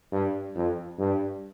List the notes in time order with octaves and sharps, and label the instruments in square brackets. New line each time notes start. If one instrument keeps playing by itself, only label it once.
[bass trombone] G2
F2
G2